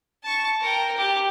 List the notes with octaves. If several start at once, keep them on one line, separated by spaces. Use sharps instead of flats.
A5 C#6
A#4 G5
G4